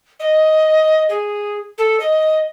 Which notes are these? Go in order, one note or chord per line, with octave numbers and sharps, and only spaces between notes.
D#5
G#4
A4
D#5